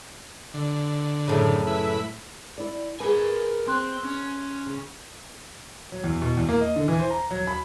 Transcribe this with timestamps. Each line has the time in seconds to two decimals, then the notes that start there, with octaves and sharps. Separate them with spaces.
0.54 D3
1.28 F#2 A2 C#3
1.67 E4 B4
2.58 E4 D5
3.00 G#4 A#4 B4 G#5
3.68 C4 C6 F#6
4.05 C#4
4.66 C#3
5.92 F#3
6.04 E2
6.22 B2
6.37 E2
6.49 A#3
6.61 D#5
6.76 D3
6.88 E3
6.99 C5
7.11 A#5
7.31 F#3
7.47 B5